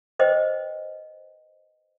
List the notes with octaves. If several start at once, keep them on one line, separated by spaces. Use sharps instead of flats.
B4 C5 D#5 G5